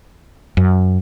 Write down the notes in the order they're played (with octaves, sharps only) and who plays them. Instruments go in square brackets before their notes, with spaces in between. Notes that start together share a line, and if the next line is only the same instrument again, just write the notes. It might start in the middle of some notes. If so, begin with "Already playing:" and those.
[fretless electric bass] F#2